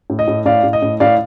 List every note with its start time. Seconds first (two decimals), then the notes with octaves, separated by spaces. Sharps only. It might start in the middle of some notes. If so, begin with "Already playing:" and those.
0.10 A2
0.19 D#5
0.28 A2
0.46 A2 D5 F5
0.63 A2
0.73 D#5
0.82 A2
1.00 A2 D5 F5